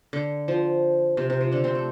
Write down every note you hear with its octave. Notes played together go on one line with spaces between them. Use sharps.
D3
F3
C3
C3
F3
D3 D4
C3 C4
A3